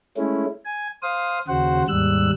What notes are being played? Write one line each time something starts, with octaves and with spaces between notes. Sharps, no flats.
G#3 A3 C#4 E4
G#5
C5 F5 D#6
D#2 C#3 F#4 C5 F#5
D#2 G#2 G3 E6 F#6